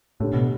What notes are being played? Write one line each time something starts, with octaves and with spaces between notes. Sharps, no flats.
A2 D3 A3 D4 G4 C#5
B2